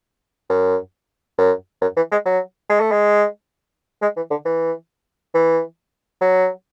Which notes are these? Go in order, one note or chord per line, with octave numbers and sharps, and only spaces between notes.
F#2
F#2
F#2
E3
G#3
F#3
G#3
A3
G#3
G#3
E3
D3
E3
E3
F#3